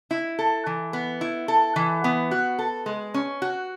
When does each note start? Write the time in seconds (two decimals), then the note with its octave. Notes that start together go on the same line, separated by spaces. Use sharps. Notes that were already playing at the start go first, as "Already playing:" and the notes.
0.11 E4
0.39 A4
0.67 E3
0.93 B3
1.21 E4
1.48 A4
1.76 E3
2.04 B3
2.31 F#4
2.59 A4
2.86 G#3
3.14 C#4
3.42 F#4